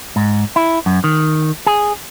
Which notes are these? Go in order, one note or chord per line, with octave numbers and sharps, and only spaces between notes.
G#2
E4
F#2
D#3
G#4